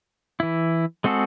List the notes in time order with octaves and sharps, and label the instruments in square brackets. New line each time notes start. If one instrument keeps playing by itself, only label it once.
[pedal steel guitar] E3 E4
G#3 C4 F#4 G#4 A4